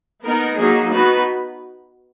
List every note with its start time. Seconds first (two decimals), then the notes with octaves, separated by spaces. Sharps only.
0.23 B3 D#4 A#4
0.57 F#3 A#3 D#4 G#4
0.91 B3 D#4 F#4 B4